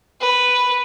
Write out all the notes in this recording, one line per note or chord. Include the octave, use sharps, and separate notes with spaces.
B4